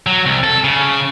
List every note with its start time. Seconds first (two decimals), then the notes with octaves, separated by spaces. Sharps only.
0.07 F#3
0.26 C2
0.43 A4
0.64 C#3